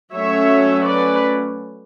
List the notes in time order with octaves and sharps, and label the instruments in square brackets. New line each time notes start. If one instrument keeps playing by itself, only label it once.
[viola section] F#3 A3 C#4 C#5 E5
B4 D5